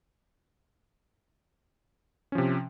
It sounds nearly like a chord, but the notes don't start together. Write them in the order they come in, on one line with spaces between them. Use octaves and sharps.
C#4 F3 C3